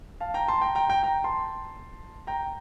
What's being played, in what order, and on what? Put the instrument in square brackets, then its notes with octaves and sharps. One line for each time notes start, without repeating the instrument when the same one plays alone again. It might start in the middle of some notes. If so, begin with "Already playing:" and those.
[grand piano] F5 A5
G5 A#5
A5 C6
G5 A#5
G5 A#5
G5 A#5
G5 A#5
A5 C6
G5 A#5